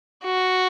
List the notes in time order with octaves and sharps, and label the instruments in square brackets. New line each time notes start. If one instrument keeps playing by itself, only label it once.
[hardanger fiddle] F#4